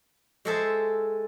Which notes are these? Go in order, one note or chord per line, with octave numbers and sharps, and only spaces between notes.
G#3 F#4 G#4 A4 C5 E5